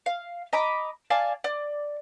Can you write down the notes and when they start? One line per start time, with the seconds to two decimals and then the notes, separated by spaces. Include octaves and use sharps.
0.06 F5
0.53 D#5 A#5 B5 D6
1.10 D5 F5 G#5 A5
1.44 D5